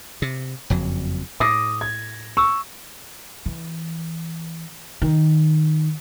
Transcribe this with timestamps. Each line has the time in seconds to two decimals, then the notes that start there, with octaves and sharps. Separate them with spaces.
0.22 C3
0.70 F#1 F2 F#3
1.40 A2 D6 D#6 A#6
1.81 G#6
2.37 C#6 E6
3.46 E3
5.02 D#3